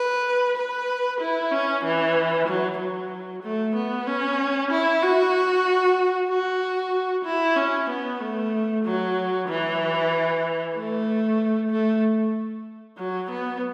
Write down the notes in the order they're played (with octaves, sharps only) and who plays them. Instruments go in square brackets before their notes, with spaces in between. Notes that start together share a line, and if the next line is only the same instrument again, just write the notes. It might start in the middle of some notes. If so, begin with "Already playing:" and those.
Already playing: [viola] B4
B4
E4
C#4
E3
F#3
F#3
A3
B3
C#4
E4
F#4
F#4
E4
C#4
B3
A3
F#3
E3
A3
A3
F#3
B3